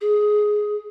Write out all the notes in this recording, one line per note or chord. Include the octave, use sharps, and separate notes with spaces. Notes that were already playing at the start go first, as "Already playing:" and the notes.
G#4